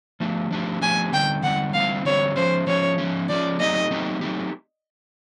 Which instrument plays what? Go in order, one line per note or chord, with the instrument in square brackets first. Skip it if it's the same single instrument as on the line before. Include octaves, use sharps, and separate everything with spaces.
[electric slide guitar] F3 A3 D4 G4
F3 A3 D4 G4
[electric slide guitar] F3 A3 D4 G4 [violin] G#5
[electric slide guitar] D3 G3 C4 [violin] G5
[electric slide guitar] D3 G3 C4 [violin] F#5
[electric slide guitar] D3 G3 C4 [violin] F5
[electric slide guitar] D3 G3 C4 [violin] C#5
[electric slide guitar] F3 G#3 C#4 [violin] C5
[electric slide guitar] F3 G#3 C#4 [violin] C#5
[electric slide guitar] F3 G#3 C#4
[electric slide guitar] F3 G#3 C#4 [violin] D5
[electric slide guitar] F#3 A3 C4 D#4 G4 [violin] D#5
[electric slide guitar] F#3 A3 C4 D#4 G4
F#3 A3 C4 D#4 G4